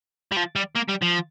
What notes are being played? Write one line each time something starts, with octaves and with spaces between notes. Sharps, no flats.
G3
F3
G3
A#3
G3
F3